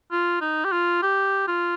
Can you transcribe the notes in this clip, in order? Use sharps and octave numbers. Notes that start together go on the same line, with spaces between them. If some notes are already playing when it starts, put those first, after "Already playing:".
F4
D#4
G4
F4
G4
F4